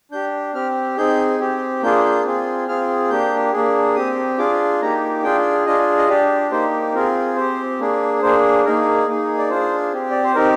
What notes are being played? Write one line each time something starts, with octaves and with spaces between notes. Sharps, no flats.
D4 G4 G6
C4 G4 F6
C4 D#4 G#4 G6
C4 G4
A#3 D4 F4 G#4 G6
G6
C4 F4 G#4
C4 F4 G#4 F6
A#3 D4 G4 G6
A#3 D4 G#4
C4 G4 D#6
D4 F4 G#4 D6
A#3 D#4 G4 A#5
D4 F4 G#4 G5
D4 F4 G#4 D#5
D#5
D4 G4 D5
A#3 D#4 G4 C5
C4 F4 G#4 A#4
C4 G4 C5
A#3 D4 G#4
A#3 D4 G#4 C5
A#3 D#4 G#4 A#4
A#3 D#4 G#4
D5
D4 F4 G#4 C5
C4 G4
D5
C5
C4 D#4 G4 A#4